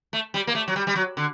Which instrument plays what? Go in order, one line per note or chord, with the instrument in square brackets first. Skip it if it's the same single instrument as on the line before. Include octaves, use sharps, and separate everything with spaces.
[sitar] A3
G3
A#3
A3
F#3
G3
G3
F#3
D3